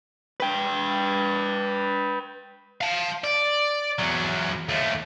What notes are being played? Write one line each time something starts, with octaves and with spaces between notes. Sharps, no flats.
B4 G5
F5 A5
D5
E2 F#3
D#2 A3